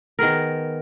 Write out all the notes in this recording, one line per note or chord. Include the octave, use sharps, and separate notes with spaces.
D#3 B3 G#4 A#4